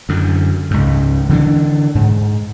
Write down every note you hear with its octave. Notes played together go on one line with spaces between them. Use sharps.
F#2 D3
C#2 G#2
D3 E3 B3 D4
G#2